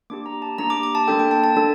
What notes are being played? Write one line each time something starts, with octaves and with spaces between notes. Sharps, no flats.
A#3 D4 G4 D6
A#5
A5
A#3 D4 G4 A#5
D6
D6
A5
A#3 D4 A4 G5
G5
A5
A5
A#3 D4 A4